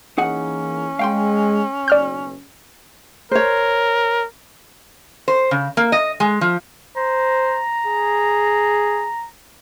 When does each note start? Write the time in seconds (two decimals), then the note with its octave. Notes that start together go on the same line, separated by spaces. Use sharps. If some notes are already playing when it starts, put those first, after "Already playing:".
0.18 E3 A#3 C#4 D#4 G#4 F#5
0.99 G#3 F5 G5 C6
1.88 F#1 B1 D5 F6 G6
3.31 A#4 C5 C#5
5.28 C5
5.51 C#3
5.77 A#3
5.92 D#5
6.20 G#3
6.41 F3
6.97 C5 A#5
7.86 G#4